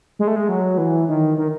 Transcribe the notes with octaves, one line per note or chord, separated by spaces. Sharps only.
G#3
A3
G#3
F#3
E3
D#3
D#3